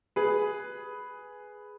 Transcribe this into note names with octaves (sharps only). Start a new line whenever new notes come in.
G#4 B4